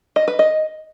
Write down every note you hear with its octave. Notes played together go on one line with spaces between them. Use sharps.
D#5
B4
D#5